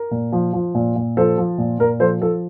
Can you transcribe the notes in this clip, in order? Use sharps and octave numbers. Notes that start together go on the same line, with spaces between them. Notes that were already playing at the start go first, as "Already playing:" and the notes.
Already playing: A#4
A#2
F3
F3
A#2
A#2
F3 A4 C5
F3
A#2
A#2 A#4
F3 A4 C5
F3 A4